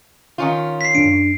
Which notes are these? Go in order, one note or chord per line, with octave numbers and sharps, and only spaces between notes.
D#3 C#4 F4
B6 C7
F#2 D4 D7